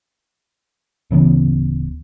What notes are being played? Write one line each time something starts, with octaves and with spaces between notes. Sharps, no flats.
D1 C#3 E3 B3